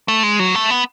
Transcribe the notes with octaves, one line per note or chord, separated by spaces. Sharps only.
A3
G#3
F#3
A3
B3